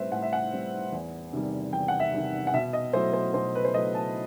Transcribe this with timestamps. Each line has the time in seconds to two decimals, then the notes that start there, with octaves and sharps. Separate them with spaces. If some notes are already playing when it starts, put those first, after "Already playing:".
Already playing: A2 G3 C4 B4 C5 E5
0.11 A2 F#5
0.23 E5
0.33 F#5
0.53 G3 C4
0.92 E2
1.33 C3 D#3 G3
1.73 E2 G5
1.88 F#5
2.00 E5
2.13 C3 D#3 G3
2.47 F#5
2.54 B2 E5
2.73 D#5
2.93 F#3 A3 E4 C5
3.13 C5
3.34 B2 C5
3.55 B4
3.65 C5
3.74 F#3 A3 E4 D#5
3.95 A5